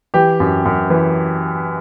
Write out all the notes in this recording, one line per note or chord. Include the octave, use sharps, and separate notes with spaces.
E3 G4
F#2
F#2
E3